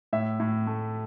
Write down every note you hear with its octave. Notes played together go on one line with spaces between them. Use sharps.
A2 E5
A2
A3